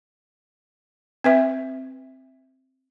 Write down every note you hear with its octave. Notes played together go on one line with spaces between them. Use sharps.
C4 B4 E5